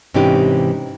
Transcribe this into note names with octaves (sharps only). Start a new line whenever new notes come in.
G#2 C3 E3 C#4 D#4 G4